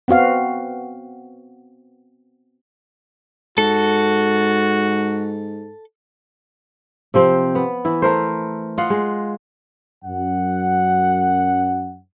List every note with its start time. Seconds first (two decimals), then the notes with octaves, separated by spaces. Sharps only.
0.08 B3 C4 F#4 F5
3.58 G#2 F#4 A4
7.14 C3 F3 C4
7.55 B3
7.85 E3 E4
8.02 A3 A#4 C5
8.78 F4 D#5 F5 F#5
8.90 G#3
10.05 F#2 F#5